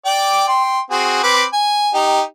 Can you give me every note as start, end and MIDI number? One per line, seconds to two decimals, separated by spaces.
0.05 0.48 74
0.05 0.48 79
0.05 0.48 86
0.48 0.79 79
0.48 0.79 84
0.90 1.20 60
0.90 1.20 66
0.90 1.20 68
1.23 1.43 60
1.23 1.43 71
1.23 1.43 86
1.53 1.90 80
1.94 2.21 63
1.94 2.21 67